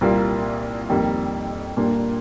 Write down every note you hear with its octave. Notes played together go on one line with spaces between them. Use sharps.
C2 A#2 G3 A#3 F4
F2 D#3 G3 A#3
A#2 G3 A#3 D4